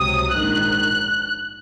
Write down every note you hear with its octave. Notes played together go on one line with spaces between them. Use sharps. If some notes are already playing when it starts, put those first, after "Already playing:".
Already playing: C#2 C3 F#3 D#6
A#1 G#2 D#3 F#6